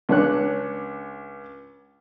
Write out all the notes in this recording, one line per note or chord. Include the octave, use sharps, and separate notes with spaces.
C#2 D4 C#5 F#6